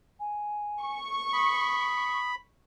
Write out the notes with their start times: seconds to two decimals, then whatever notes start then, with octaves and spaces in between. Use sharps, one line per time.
0.20 G#5
0.83 C#6
1.33 B5 D#6